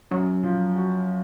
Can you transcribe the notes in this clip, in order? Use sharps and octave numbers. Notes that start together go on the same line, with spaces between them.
F#2 F#3
F3
F#4